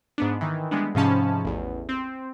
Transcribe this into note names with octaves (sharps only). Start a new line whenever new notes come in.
G#2 B3 D4
D#3 E3
E3 G3 G#3 B3 D4
G#2 C3 F3 C#4 A5 B5
A1 E2
C4